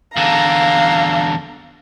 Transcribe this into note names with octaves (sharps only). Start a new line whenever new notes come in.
E2 D3 F5 A#5